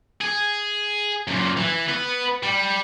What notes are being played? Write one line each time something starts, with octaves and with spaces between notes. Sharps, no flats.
G#4
F#2 A#2
E3
B3 B4
G3